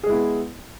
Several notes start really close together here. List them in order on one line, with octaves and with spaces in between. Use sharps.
G#4 G#3 E4 B3